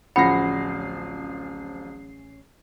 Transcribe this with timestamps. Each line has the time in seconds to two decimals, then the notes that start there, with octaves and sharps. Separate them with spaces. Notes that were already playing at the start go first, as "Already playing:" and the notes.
0.16 D1 A1 F3 C#4 F#5 B5 A#6 C7